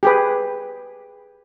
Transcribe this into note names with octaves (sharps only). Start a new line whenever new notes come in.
G4 G#4 B4